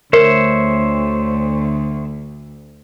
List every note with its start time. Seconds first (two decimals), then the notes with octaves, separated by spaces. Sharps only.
0.13 D2 A#4 C5 C#5 E5